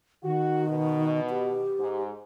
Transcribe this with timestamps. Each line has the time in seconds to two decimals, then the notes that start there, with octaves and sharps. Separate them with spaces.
0.24 D#3 F#4
0.67 B2
1.30 G4
1.79 G#2